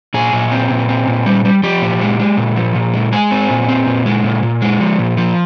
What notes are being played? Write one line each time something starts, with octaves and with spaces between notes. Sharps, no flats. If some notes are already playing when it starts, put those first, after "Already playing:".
A#2 G#4
A#2
C4
A#2
C4
A#2
G3
G3
F3 G4
A#2
G#3
G#3
A#2
F3
A#2
G#3
G#3 G#4
C4
A#2
C4
A#2
G#3
A#2
A#2
G#3
F3
A#2
F3